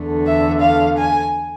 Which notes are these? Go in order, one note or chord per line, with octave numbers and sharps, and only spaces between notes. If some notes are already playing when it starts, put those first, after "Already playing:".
Already playing: E2 D3 A3
E5
F5
G#5